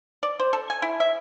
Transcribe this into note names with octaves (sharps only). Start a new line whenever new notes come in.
D5
C5
A4
G#5
E4
E5